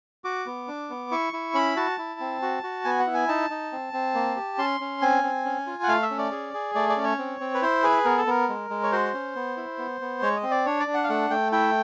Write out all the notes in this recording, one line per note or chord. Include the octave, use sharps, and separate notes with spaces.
F#4 D6
B3
D4
B3
E4 C#6
E4
C#4 B5
F#4 A5
E4
C4
F#4
F#4
B3 G#5
F#5
E4
G#5
D#4 A5
D#4
C4
C4
A#3
G4
C#4 C6
C#4
C4 G#5
C4
C#4
F4
F#5
A3 F5
E5
C#4
D5
G#4
G#4
A3 D5
D5
C#4
C#5
C4
C4
B4
E4 C5
G#4 B4
B3 A#4
A4
B3 A#4
G#3
G#3
C#5
F#4 C5
C#4
B3
E4
B3
B3
G#3 C#5
D#5
C4
D5
D4 C#5
D5
D4
F#5
F5
A3 F#5
A3 G5
E4 G5